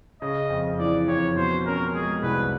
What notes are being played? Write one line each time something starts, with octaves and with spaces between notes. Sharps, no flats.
C#3 D#5
F2
E3 D5
F2 C#5
B2 C5
C#4 A#4
G#3 G#4
C2 B4